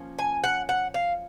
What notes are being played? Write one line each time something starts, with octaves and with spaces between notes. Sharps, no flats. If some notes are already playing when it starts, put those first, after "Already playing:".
Already playing: F3 A#3 C#4
G#5
F#5
F#5
F5